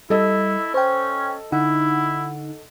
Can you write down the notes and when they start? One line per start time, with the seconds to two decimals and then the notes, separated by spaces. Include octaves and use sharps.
0.10 G3 E4 A4 D#5
0.74 C#4 C5 G5
1.52 D3 D#4 E4 F#5